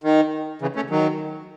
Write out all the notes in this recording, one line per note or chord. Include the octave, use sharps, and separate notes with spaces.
D#3
C#3 E3
A3 C#4
D#3 F#3